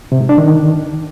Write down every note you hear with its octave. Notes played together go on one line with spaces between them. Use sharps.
C3
G#2
D4
D#3